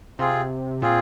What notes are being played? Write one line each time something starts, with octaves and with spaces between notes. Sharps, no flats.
C3 C4 F4 G#4
A#2 C4 F4 G#4